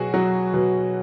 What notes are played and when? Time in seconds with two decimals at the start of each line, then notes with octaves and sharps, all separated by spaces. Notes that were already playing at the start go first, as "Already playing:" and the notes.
Already playing: B2 F#3 F#4 G#4
0.14 F#3
0.54 B2